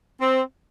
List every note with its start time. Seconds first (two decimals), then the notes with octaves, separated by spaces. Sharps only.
0.19 C4